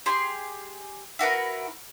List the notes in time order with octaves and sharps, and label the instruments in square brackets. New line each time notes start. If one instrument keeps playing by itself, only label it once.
[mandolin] G4 G#4 C6
E4 F#4 A#4 B4